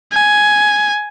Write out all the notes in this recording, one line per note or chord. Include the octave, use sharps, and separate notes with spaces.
G#5